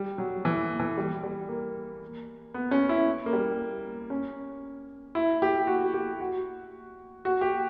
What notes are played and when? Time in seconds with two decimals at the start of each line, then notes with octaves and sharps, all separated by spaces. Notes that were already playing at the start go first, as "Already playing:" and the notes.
Already playing: G3
0.18 F#3
0.45 E3
0.80 E3
0.97 G3
1.23 G3
1.49 A#3
2.54 B3
2.71 C#4
2.89 E4
3.26 A#3
3.33 G3
4.10 C#4
5.15 E4
5.42 G4
5.67 F#4
5.94 G4
6.20 F#4
7.25 F#4
7.41 G4